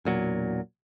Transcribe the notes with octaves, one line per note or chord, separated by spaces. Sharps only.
E1 A#2 F#3